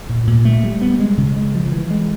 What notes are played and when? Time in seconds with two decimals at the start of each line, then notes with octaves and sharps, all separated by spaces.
0.09 A#2
0.27 A#2
0.45 A3
0.64 G3
0.81 B3
0.99 G#3
1.18 C#3
1.36 G#3
1.55 F3
1.72 E3
1.91 G#3